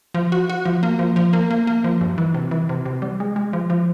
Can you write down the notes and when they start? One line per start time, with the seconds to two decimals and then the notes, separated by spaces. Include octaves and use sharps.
0.14 F3
0.32 F#4
0.50 F#4
0.65 F3
0.83 A#3
0.99 F3
1.16 F3
1.33 A#3
1.51 A#3
1.67 A#3
1.84 F3
2.01 G2
2.18 E3
2.34 C3
2.51 E3
2.69 C3
2.86 C3
3.02 G3
3.20 G#3
3.36 G#3
3.53 F3
3.70 F3